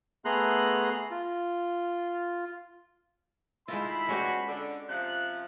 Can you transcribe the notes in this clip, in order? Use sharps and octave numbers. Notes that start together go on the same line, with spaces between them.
A3 B3 G#4 A#5 C6 F#6
F4
D#3 G#3 A3 E4 F4 B5
G#3 B3 C#4 D4 F#4 G4
D3
C3 F3 F#6